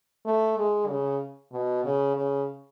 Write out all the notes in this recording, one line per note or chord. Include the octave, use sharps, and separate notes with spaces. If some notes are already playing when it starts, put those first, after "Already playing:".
A3
G#3
C#3
B2
C#3
C#3